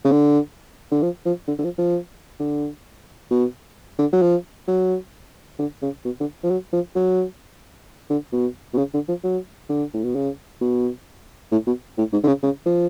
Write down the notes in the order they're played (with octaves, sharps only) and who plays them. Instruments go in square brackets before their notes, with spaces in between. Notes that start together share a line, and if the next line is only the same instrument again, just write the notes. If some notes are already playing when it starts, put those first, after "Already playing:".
[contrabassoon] C#3
D3
D3
F3
F3
D3
D3
F3
F3
D3
B2
D3
F#3
F3
F#3
D3
C#3
B2
D3
F3
F#3
F3
F#3
D3
B2
B2
C#3
D3
F3
F#3
D3
A2
B2
C#3
B2
A2
B2
A2
G#2
D3
C#3
C#3
F3